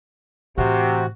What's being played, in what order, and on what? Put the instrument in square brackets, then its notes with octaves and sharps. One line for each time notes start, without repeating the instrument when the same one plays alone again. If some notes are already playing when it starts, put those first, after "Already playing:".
[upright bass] A2 E3 [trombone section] C3 [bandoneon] F#4